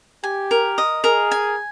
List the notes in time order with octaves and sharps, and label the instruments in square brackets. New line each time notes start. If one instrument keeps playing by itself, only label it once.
[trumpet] G4 [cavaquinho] G#5
[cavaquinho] A#4
D#5
[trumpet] G#4 [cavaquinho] A#4
[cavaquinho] G#5